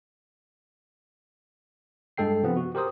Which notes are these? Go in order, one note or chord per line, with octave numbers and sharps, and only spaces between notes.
G2 G#3 A4 G5 C7
C3 F3 B3 C4
F#4
G4 A#4 C5 D#6